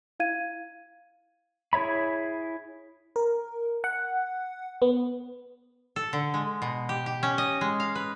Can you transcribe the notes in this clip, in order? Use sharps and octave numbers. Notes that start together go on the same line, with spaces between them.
E4 F5 G#6 D#7
E4 G#4 C#5 E5 B5
A#4
F#5
B3
A4
D3
G#3
B2
G4
G4
C#4
D#5
G#3
F5
B4